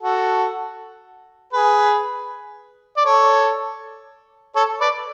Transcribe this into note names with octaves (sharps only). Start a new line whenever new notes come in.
F#4 A4
G#4 B4
D5
A4 C#5
A4 C#5
B4 D5